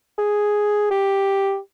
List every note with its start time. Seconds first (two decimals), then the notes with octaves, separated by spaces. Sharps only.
0.18 G#4
0.91 G4